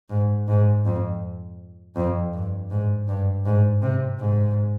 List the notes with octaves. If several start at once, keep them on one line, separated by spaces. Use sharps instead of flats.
G#2
G#2
F2
F2
G2
G#2
G2
G#2
C3
G#2